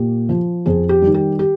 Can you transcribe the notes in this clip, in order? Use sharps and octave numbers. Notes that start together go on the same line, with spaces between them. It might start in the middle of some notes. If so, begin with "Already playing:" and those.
Already playing: A#2 G4
F3
F2 G#4
G4
D#3 G3
G4
G4